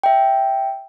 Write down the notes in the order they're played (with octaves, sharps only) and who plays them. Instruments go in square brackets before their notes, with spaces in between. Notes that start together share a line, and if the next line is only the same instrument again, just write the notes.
[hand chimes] E5 G5